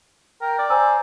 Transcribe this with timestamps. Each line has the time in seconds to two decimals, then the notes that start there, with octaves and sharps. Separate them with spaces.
0.41 A#4 G5
0.59 D5
0.70 C5 G#5 A#5 E6